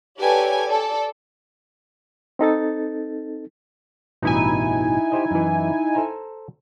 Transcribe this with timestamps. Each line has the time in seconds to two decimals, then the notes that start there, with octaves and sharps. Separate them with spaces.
0.19 G4 A4 B4 C#5 D5 G#5
0.67 A4 D5
2.39 C4 D#4 A4 A6
4.22 A1 G2 B2 D#4 E4 G#5
5.12 G4 C5 D#5
5.31 F#2 E3
5.95 A4 C5 A#5